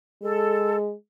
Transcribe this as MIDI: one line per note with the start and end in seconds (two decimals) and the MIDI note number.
0.22 0.94 56
0.22 0.77 69